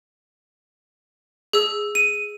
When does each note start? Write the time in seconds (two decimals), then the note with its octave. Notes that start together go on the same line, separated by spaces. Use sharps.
1.53 G#4 E6
1.95 D#7